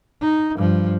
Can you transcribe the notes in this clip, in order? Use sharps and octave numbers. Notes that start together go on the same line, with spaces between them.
D#4
G2 F3